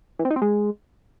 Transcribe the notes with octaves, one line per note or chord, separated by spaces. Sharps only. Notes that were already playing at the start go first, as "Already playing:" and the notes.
E3
C4
D#4
C4
G#3